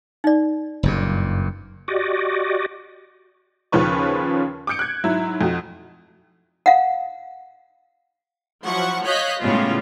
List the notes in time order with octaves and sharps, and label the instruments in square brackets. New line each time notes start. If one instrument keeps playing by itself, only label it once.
[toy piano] D#4 D5
[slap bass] F#1 G2 A#2
[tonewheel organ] F#4 G4 D5 D#5
[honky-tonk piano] D#2 C#3 F3 C#4 B4 C#6
D6 D#6 G6 C#7 D7
F#6 G#6
G#2 F#3 E4
F2 F#4
[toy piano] F5 F#5
[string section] F3 F#3 E4 F#5 C#6
C#5 D#5 F5 F#6 G6 B6
A2 C#3 G3 G#3 B3 F4